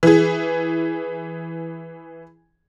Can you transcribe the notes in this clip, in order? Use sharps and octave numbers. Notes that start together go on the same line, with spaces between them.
E3 G#4